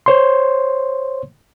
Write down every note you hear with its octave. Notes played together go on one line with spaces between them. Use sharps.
C5 C#5 C6